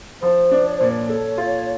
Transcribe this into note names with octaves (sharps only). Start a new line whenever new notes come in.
F3 C5
D4
C#5
A#2 C5
C#5
A4
F4